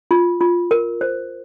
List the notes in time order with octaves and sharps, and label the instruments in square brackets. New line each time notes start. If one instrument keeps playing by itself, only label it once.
[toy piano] F4
F4
A#4
C5